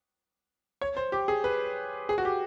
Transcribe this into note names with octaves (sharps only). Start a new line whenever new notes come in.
C#5
C5
G4
G#4
B4
G#4
F#4
G4